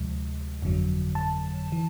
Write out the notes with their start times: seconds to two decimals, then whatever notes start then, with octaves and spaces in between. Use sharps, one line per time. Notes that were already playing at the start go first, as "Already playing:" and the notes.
Already playing: D2 C3 F3 G#3
0.62 G1 F2 D3 F#3
1.15 A5
1.72 E3